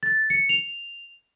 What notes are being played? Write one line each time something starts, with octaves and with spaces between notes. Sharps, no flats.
A6
C#7
F7